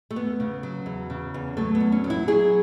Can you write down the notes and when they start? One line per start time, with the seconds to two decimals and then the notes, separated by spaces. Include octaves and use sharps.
0.11 A3
0.16 E2 B3
0.40 C#3
0.63 F#3
0.86 E2
1.10 C#3
1.34 E2
1.57 F#3 A3
1.75 B3
1.80 E2
1.92 C#4
2.04 F#3
2.10 E4
2.28 F#3 G#4